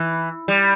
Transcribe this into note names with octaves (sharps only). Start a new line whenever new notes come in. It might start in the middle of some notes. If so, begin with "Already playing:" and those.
Already playing: E3
G3